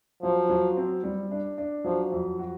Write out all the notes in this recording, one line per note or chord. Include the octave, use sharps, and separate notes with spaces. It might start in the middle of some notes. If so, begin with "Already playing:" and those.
F3 F#3
F#3
C4
G3
D4
D4
F3 F#3
F2
F#4